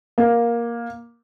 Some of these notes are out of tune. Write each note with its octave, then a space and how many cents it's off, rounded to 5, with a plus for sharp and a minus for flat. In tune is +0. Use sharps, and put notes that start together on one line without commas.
A#3 +10